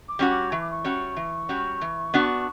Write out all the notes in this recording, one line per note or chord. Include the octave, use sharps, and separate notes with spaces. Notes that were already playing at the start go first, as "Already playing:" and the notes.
D6
G3 C#4 F#4
D6
E3 C#6
D6
C#6
G3 C#4 F#4
E3
G3 C#4 F#4
E3
B3 D4 F#4